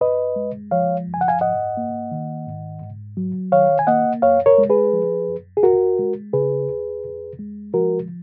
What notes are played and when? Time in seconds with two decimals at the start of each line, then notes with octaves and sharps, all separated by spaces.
0.01 F#2 B4 D#5
0.36 G#3
0.71 F3 C#5 F5
1.07 F#2
1.14 G#5
1.21 F#5
1.28 F5 G#5
1.41 G#2 D#5 F#5
1.77 A#3
2.11 D#3
2.47 G#2
2.82 G#2
3.17 F#3
3.52 D#3 C#5 F5
3.79 G#5
3.87 A#3 D#5 F#5
4.22 F#2 C#5 F5
4.46 A#4 C#5
4.58 G#3
4.70 G#4 B4
4.93 F3
5.29 F#2
5.57 G#4
5.63 D#2 F#4 A#4
5.99 G#3
6.33 C#3 G#4 B4
6.68 D#2
7.04 F2
7.39 G#3
7.74 F3 F#4 A#4